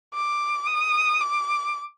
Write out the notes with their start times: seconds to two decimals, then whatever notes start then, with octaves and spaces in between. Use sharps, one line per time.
0.14 D6
0.67 D#6
1.21 D6